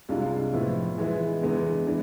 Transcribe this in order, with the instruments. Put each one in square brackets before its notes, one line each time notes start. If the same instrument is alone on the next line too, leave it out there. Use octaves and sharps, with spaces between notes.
[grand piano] C2 C3 G#3 D4 F4
A2 F3 B3 E4
E3 G#3 B3 E4
E2 D3 G#3 B3 E4
E3 G#3 D4